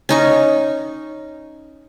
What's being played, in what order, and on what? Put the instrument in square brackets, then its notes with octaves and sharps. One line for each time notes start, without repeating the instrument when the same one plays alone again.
[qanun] C#4 D#4 C#6